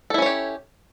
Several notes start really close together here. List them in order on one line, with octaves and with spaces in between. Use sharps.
A4 E4 C#4 C#5 G4